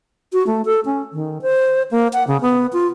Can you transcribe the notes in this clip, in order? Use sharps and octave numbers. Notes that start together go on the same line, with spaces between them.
F#4
A3
A4
C#4
D#3
C5
A#3
F#5
C#3
B3
F4